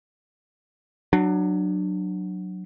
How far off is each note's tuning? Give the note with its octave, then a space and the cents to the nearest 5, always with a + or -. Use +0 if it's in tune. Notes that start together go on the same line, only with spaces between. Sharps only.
F#3 +0 D4 +25